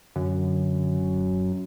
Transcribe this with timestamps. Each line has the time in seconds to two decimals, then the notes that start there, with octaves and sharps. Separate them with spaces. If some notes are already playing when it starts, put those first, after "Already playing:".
0.16 F#2 D3
1.02 D#1